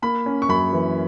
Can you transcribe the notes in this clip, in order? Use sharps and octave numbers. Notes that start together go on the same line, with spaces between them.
A#3 B5
C#4
C#6
F#2 B5
E3